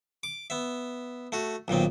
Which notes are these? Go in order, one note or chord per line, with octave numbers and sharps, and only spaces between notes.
D6
B3 E5
A3 F#4
B1 A#2 D#3 C4